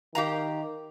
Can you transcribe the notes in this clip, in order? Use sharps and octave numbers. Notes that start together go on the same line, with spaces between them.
D#3 G4 F5 A#5